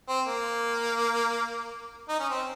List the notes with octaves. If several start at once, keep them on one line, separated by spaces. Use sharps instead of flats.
C4
A#3
D#4
C#4
C4